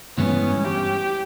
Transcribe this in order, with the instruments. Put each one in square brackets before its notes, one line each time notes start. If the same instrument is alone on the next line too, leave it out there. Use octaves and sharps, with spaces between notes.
[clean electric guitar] G2 E3 G#3 B3 [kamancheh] C#4
[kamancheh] G4